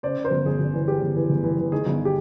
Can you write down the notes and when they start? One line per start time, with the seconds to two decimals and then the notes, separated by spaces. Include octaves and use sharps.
0.03 C#3 C5 D5
0.17 C#3
0.24 A#4 C5
0.31 G1
0.46 G1 G#4
0.60 G1
0.73 E3
0.87 E3 G4
1.02 G1
1.16 E3
1.30 G1
1.44 E3
1.58 E3
1.72 D#3 G#4
1.86 G1
2.05 G4